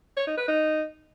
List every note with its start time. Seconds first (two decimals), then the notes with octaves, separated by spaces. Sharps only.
0.17 C#5
0.27 D#4
0.38 B4
0.48 D#4